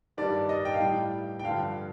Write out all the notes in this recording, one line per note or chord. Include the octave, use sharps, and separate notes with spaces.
G2 D#3 G3 D5
D#5
G5
F5
A2 G3 G5
G5
G2 D3 F3 F5